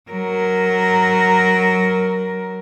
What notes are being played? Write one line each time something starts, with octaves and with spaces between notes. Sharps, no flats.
F#3 A#4